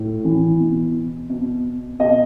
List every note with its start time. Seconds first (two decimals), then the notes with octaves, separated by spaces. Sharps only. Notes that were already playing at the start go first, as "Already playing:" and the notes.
Already playing: A2
0.25 E3
0.59 B2
1.29 B2
1.99 B2 D#5